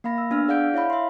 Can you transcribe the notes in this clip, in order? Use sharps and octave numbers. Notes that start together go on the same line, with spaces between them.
A#3 F5 B5 A#6
E6
B3 D4 E6 F6
G#4 D5 F5 F#5 G6 D7
E4 C#5 E5 F5 B5
E5 C6